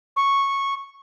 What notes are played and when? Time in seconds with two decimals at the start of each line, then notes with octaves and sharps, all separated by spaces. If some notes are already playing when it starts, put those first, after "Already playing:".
0.16 C#6